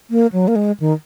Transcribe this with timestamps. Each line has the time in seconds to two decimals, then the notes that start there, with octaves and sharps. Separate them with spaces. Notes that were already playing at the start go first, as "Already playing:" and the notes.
0.11 A#3
0.32 F#3
0.48 A#3
0.56 G#3
0.80 D#3